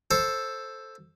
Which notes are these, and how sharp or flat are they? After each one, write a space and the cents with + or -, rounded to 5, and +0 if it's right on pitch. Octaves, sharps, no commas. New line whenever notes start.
A4 +0 C5 +10